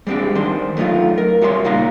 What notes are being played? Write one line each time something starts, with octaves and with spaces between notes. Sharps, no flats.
G3 G#3 C4 D4 G4
D#3 D4 C5
F#3 A3 B3 D#4 F4
A#4
G3 F#4 C#5 E5 A5 C6
C#2 A#2 D#4 F5 A#5